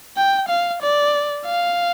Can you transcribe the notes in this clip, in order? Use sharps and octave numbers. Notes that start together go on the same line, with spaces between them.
G5
F5
D5
F5